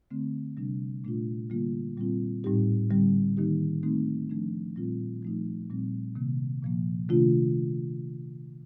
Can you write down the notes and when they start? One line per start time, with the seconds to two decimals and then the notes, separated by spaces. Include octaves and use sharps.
0.11 D3 A3 C4
0.57 C3 G3 D4
1.04 A#2 A3 D4 F4
1.50 D3 G3 A#3 F4
1.97 A#2 G3 C4 F4
2.44 A2 G3 C4 D#4 G4
2.90 D3 G3 C4 G4
3.37 D#3 A#3 D#4 G4
3.83 D#3 A3 C4 D#4
4.30 F3 A3 D4
4.76 A#2 G3 C4 F4
5.22 F3 A3 D#4
5.70 A#2 G3 C4
6.16 C3 D#3 A#3
6.63 A#2 F3 A#3
7.09 C3 D#3 A3 D4 F4